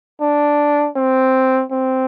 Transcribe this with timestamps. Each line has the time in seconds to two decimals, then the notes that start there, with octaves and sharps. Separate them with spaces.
0.21 D4
0.96 C4
1.72 C4